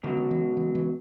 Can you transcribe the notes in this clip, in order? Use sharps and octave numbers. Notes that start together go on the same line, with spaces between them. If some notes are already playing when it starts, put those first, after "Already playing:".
C#2 B2 D3 F#3
D3
E3
E3
E3